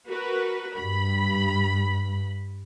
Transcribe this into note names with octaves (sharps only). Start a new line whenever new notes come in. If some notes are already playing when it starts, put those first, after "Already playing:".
F#4 A#4 B4
G2 B5